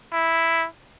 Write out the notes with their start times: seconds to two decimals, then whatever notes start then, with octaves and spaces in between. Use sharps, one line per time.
0.13 E4